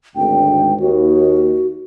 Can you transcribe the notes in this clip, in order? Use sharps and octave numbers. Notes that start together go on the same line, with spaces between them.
G#1 D2 G5
D#2 F#4